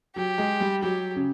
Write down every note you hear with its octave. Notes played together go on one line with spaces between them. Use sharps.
F#3 G4
G#3
G3
F#3 G4
C#3